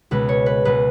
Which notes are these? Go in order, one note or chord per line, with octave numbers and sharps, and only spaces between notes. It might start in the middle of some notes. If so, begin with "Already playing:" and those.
C#2 B2 G#3 B4
C#5
B4
C#2 B2 G#3 B4